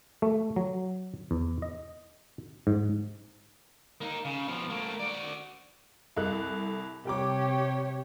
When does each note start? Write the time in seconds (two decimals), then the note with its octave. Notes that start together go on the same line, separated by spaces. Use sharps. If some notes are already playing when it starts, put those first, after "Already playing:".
0.22 A3
0.56 F#3
1.31 E2
1.62 D#5
2.67 G#2
4.01 A#3 D#4
4.25 C#3
4.48 B2 F3
4.70 A3 A#3
5.00 F#4 D5
6.16 C2 A4 F#6
7.05 C3 G3 G4 C#5 G5 D6